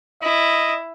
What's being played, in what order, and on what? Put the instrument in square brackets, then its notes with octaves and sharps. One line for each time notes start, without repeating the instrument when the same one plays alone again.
[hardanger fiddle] E4 [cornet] D#5